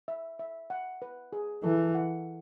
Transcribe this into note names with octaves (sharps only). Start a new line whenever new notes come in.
E5
E5
F#5
B4
G#4
E3 A4
F#5